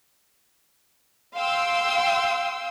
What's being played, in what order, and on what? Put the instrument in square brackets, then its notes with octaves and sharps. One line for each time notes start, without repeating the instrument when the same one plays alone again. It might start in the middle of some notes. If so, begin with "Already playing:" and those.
[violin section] F5 G5 C6 E6